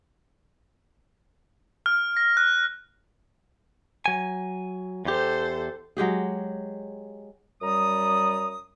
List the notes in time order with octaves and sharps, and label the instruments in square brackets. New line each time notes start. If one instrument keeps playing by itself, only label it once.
[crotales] F6
A#6
F#6
[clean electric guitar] F#3 G#5
[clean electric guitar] E2 G4 [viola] A4 C5
[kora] F#3 G#3 G4 G#4
[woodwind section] F#2 G3 A#5 D#6